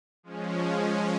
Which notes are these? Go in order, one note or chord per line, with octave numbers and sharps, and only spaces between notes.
F3 G#3 C#4